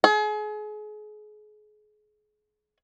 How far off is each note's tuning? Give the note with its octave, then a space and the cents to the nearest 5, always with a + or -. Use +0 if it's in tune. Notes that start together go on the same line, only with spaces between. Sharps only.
G#4 +35